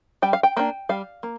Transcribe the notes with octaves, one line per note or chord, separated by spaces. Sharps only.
G3 G5
F5
G5
A#3 D4 G5
G3 F5
A#3